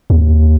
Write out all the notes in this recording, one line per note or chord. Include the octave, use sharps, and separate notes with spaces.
D#2